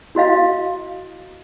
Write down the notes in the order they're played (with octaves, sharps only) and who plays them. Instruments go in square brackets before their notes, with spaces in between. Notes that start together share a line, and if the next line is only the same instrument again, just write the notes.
[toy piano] E4 F#4 D#5 F5